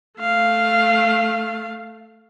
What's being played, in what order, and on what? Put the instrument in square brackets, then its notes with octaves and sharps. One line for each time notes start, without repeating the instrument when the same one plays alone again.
[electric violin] A3 F5